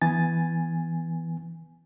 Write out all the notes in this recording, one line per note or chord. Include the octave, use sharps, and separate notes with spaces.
E3 B3 G#5 A6